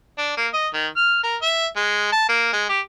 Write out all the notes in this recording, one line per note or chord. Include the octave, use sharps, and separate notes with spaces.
D4
A#3
D#5
D#3
F6
A#4
E5
G#3
A5
A#3
G#3
G4